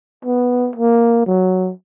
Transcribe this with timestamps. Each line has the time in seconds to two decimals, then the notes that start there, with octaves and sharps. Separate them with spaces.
0.25 B3
0.76 A#3
1.26 F#3